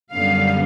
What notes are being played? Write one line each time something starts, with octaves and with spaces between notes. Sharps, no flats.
F#2 D3 G3 B3 F5